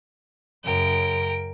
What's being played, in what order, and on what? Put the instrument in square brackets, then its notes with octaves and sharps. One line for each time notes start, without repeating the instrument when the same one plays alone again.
[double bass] F#2 C#3 [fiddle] A#4 G5